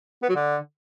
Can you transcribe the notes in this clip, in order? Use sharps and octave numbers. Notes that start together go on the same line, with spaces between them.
B3
F#3
D3